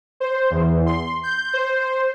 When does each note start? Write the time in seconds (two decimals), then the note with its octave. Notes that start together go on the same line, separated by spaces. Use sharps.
0.20 C5
0.51 E2
0.86 C6
1.23 G6
1.53 C5